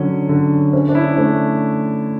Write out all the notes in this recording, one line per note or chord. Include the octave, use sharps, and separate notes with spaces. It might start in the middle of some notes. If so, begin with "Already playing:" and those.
Already playing: D3 F#3 C#4
D3
C#4
D4
E4
A3 D4